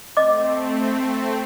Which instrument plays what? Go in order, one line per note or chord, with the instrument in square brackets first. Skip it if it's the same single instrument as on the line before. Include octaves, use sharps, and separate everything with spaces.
[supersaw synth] A3 C4 [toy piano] D#5 D6